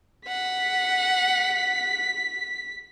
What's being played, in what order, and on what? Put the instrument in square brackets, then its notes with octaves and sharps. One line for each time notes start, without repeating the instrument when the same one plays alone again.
[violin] F#5 [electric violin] B6